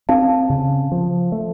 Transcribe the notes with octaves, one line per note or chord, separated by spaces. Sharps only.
C4 F5 A5
C#3
F3
A3